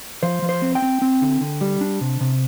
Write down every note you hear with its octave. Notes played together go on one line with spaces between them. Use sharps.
F3 C5
F3
C5
C4
G5
C4
C4
D3
D3
G3
D4
C3
C3